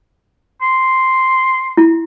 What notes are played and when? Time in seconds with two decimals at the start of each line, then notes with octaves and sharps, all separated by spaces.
0.62 C6
1.77 E4